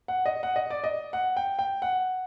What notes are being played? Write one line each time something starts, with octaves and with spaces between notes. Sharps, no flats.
F#5
D#5
F#5
D#5
D5
D#5
F#5
G5
G5
F#5